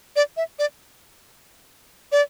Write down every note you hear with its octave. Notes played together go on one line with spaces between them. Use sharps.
D5
E5
D5
D5